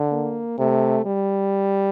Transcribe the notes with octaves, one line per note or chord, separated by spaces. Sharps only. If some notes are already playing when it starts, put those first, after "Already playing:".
Already playing: D3
A#3
C3 A3
G3